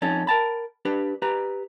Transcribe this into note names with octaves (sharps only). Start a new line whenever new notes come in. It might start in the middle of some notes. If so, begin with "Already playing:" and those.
F2 C#4 D#4 A4
A#4 G5 A5 B5
D4 G4 B4
G4 B4 A#5